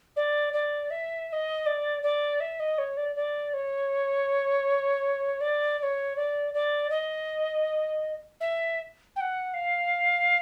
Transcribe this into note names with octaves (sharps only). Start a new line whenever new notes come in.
D5
D5
E5
E5
D#5
D5
D5
E5
D#5
C#5
D5
D5
C#5
D5
D5
C#5
D5
D5
D#5
E5
G5
F#5
F5